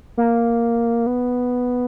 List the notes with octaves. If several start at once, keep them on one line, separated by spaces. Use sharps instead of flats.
A#3
B3